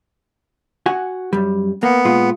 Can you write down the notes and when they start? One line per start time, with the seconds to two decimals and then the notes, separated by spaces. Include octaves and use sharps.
0.86 F#4 F#5 G#5
1.33 F#2 G3
1.83 A#3 B3
2.05 A#2 G#3 F4